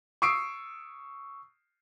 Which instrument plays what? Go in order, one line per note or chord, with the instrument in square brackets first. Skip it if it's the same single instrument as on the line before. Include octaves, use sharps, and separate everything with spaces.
[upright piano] C#6 D#6 E6 C7 D7